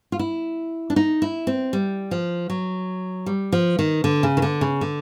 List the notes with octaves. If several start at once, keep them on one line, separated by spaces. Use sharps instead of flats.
F4
E4
D4
D#4
E4
C4
G3
F3
F#3
G3
F3
D#3
D3
C#3
D#3
D3
C#3
D3